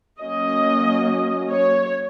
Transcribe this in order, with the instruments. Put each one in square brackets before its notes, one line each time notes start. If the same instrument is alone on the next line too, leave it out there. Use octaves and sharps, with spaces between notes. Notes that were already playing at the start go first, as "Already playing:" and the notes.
[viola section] F#3 A#3 C#4 D#5
C#5